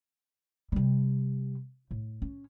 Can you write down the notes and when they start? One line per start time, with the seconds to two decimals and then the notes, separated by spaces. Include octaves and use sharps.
0.72 C3 G3
1.91 A2
2.22 C#4